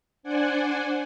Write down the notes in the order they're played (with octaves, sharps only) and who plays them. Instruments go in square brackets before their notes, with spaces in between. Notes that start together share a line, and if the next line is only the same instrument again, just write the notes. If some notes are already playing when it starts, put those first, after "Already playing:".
[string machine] D4 C5 D5 F#5 G#5